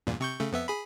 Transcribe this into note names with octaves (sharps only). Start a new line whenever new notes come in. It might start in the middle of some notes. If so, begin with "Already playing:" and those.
E2 G2 A#2
C3 C#6 G6
C#3 A3
F2 B3 E5
G#4 B5